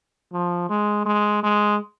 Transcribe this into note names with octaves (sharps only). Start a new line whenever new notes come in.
F3
G#3
G#3
G#3